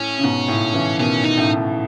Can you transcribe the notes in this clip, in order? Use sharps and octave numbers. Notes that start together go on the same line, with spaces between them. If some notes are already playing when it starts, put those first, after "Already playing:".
Already playing: A2 C#4
C#3
G#2 B2
A2 C#3
C#3 E3
B2 D#3 C#4
D#4
A2 C#3